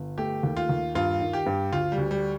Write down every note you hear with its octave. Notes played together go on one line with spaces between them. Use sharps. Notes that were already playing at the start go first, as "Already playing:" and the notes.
Already playing: G1
A3 G4
D#2
F4
D#2
G2 F4
D#3
G4
G2
D2 F4
G3
D2
G3